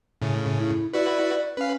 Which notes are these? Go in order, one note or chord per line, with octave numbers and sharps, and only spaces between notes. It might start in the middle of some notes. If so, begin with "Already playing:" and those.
A2 C#3
E4
E4 F#4 B4 D5
C#4 B4 F5